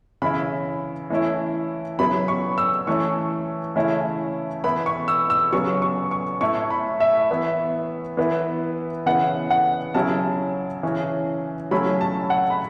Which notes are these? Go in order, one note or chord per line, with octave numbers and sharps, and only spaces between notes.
C#3 E3 C#4 E4 B5
E3 A3 C#4 E4
C#3 F#3 B3 E4 B5
C#6
E6
E3 A3 C#4 C#6
C#3 E3 A3 C#4 E4
E3 B3 E4 B5
C#6
E6
E6
C#3 F#3 B3 C#6
C#6
C#6
A2 A3 E4 C#6
B5
E5
E3 B3 E4
E3 B3 E4
C#3 E3 B3 E4 F#5
F#5
C#3 F#3 C#4 E4 A5
C#3 E3 C#4
C#3 F#3 A3 C#4 E4 B5
A5
F#5
B5